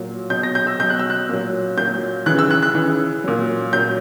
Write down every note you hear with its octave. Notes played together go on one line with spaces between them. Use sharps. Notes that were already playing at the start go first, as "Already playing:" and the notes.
Already playing: A#2 F#3
B2 F#3 G6
A#6
G6
E6
B2 F#3 G6
F#6
E6
F#6
A#2 F#3
A#2 F#3 G6
C#3 E3 F#6
E6
F#6
F#6
C#3 E3
A#2 F#3
A#2 F#3 G6